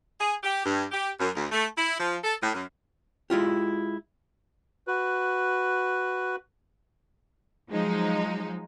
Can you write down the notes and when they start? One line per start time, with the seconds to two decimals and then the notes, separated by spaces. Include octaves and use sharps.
0.20 G#4
0.43 G4
0.66 G2
0.92 G4
1.20 F#2
1.35 D2
1.51 A3
1.77 E4
2.00 F3
2.24 A4
2.42 A2
2.53 F#2
3.30 G#3 E4 F4 G4
4.87 F#4 B4
7.70 F3 F#3 G#3 D#4